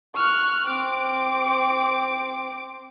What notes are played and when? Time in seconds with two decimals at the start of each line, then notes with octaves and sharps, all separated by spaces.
0.16 C#6 F6 F#6
0.67 C4 D6 D7